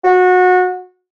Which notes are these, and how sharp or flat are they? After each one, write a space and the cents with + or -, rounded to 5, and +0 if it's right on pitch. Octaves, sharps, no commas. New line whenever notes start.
F#4 -25